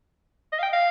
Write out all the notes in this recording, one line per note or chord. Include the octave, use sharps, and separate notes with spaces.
D#5
F5
G5
F5